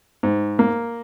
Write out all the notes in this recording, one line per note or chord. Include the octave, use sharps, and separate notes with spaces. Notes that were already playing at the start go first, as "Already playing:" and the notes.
G#2
A#3